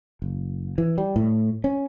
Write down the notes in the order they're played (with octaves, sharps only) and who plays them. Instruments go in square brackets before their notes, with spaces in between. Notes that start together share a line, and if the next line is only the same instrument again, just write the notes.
[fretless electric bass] F#1
E3
G3
A2
C#4